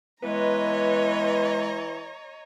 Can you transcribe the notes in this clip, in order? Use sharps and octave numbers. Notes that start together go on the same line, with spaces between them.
E3 G#3 B3 B4 C#5 D#5 A#5